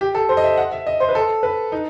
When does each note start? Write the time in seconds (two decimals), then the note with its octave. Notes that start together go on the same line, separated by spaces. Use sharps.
0.01 G4
0.15 A4
0.29 C5
0.37 D#5
0.44 E5
0.57 F#5
0.72 E5
0.87 D#5
1.00 C5
1.09 B4
1.15 A4
1.43 B4
1.72 D#4